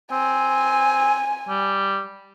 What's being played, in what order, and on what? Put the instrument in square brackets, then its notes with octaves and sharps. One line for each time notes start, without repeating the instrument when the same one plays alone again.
[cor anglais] C4 [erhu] G#5
[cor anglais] G3